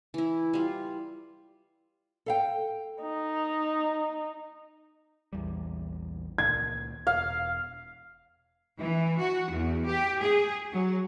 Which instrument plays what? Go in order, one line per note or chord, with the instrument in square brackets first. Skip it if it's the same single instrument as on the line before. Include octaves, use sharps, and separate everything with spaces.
[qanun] E3 E4
G3 F4
[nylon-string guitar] A4 F5 G5
[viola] D#4
[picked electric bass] A#1 E2 G3
[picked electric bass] C#2 A#2 D#3 [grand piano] G#6
[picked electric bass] E1 [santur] F5
[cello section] E3
F#4
E2
G4
G#4
F#3